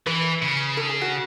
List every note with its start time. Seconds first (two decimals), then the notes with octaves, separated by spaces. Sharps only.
0.06 E3 B4
0.42 C#3
0.77 A4
0.89 G#4
1.02 F#4